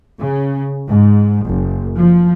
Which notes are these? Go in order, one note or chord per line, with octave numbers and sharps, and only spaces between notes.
C#3
G#2
F#1
F3